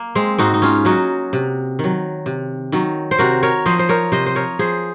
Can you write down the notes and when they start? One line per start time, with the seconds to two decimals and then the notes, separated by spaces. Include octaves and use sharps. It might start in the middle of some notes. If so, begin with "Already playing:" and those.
Already playing: A#3
0.15 G#3 C4
0.39 G#2 D#4 F#4
0.54 D#4
0.62 C#4 F4
0.85 F#3 D#4 F#4
1.33 C3
1.79 D#3 F#3
2.26 C3
2.72 D#3 F#3
3.11 C5
3.19 C3 F#4 A#4
3.43 A#4 C#5
3.66 F3 C5 D#5
3.79 C5
3.89 A#4 C#5
4.12 C3 C5 D#5
4.26 C5
4.36 A#4 C#5
4.59 F3 G#4 C5